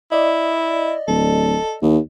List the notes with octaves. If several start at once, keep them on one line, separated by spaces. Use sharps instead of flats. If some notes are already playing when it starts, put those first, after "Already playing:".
E4 D5 D#5
D1 A4
D#2